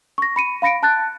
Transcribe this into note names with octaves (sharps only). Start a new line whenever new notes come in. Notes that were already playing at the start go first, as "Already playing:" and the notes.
C#6 A#6
B5 C#7 D#7
F5 B5 A#6 C#7 D7
A5 F#6 A6